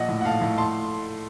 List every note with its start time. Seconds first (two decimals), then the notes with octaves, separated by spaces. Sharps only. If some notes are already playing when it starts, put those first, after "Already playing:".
Already playing: A#1 D#5 F#5
0.09 A2
0.21 F#5
0.25 A2 F5 A5
0.42 A2
0.58 A5 C6